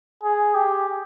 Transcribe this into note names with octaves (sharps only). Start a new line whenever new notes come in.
G#4
G4